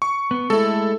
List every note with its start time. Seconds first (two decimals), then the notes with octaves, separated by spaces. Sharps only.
0.02 C#6
0.31 B3
0.50 G#3 A3 E4 A4